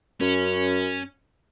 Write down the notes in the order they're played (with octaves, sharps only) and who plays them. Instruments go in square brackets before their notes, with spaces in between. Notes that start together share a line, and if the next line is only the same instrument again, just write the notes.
[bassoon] F#2 [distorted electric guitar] C#4